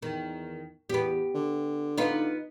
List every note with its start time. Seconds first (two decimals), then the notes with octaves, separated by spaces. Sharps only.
0.02 E2 D#3
0.90 E2 B3 G4
1.35 D3
1.98 B3 D#4 F4